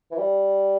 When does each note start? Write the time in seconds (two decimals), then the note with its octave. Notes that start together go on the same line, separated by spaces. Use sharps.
0.12 E3
0.18 G3